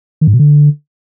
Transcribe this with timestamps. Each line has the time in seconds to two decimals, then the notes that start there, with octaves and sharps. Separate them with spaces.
0.21 D#3
0.27 G#2
0.33 B2
0.39 D3